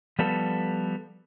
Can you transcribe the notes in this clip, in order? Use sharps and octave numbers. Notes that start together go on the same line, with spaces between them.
F3 G3 B3 A4